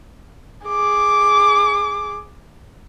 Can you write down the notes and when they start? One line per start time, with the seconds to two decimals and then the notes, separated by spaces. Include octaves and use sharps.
0.67 G#4 D6